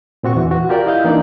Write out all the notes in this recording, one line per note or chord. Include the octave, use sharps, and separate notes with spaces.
A#2 C4 F#4 C#6
E2 E3
F#4
F4 G4 A#4 D5
E4 D#5 F5 G6
E3 A#3 D4 D#4 D5